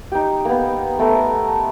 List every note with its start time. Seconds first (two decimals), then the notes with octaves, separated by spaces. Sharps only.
0.12 D#4 G4
0.45 A#3 B3
0.99 A3 B3 A4 A#4